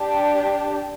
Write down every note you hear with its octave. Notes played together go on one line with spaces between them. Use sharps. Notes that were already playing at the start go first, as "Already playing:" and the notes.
Already playing: D4 G4